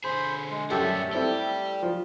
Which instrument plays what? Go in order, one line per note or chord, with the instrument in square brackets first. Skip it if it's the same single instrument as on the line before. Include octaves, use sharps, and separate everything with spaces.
[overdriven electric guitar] D3 G#4 [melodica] C5 B5
[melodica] G#3
[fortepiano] F#2 G4 A4 [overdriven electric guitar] G3 C#4 [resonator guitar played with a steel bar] A3 [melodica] E5
[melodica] G3 [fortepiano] C4 E4 A4 [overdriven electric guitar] G4
[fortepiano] F3